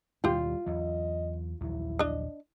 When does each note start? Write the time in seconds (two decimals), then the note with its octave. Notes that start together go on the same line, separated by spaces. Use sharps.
0.24 D#2 B2 G3 F4 G4 G5
0.66 E2 F#3 D#5
1.61 A#1 D#2 F#3 E4
1.99 D4 D#5